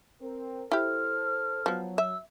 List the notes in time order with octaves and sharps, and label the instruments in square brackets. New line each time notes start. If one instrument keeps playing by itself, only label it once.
[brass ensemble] C4 A#4
[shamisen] E4 G4 [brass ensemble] A4 C5 [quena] F6
[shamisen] F3 B3 [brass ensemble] F#3
[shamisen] E5 [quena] E6